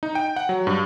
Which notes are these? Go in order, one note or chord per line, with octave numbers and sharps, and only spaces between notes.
D#4
G5
F#5
F#3
G2